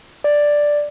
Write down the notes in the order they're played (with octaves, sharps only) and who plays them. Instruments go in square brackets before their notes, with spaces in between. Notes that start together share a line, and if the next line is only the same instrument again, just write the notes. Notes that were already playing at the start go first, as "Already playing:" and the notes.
[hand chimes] D5